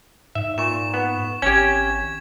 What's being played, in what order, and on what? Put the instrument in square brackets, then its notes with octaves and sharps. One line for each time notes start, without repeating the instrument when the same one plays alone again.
[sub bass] G#2 [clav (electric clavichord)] E5
[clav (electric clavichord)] A#2 [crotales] C#6 E7
[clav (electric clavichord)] B3
[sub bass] G#1 [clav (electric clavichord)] C#4 G4 [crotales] G#6